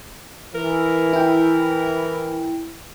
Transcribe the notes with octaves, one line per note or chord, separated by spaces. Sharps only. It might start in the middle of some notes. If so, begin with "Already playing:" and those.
E3 A#4
E4 G5